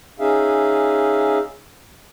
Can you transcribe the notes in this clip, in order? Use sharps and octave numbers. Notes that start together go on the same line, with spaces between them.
C#4 D#4 G#4 E5 F5